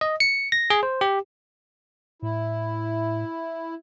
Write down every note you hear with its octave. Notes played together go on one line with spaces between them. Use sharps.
D#5
C#7
A#6
G#4
C5
G4
A2 E4